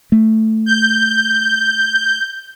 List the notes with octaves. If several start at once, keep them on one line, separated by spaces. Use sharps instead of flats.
A3
G6